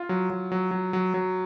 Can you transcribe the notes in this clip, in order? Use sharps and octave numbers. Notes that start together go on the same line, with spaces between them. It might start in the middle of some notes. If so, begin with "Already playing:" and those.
Already playing: F4
F#3
F#3
F#3
F#3
F#3
F#3